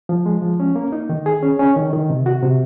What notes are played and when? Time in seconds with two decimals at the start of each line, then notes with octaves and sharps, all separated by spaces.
0.09 F3
0.26 G#3
0.42 F3
0.60 C#4
0.76 A#3
0.92 D#4
1.10 D#3
1.26 G#4
1.43 C#4
1.59 C#4
1.77 D#3
1.93 D#3
2.10 C3
2.26 F#4
2.43 C3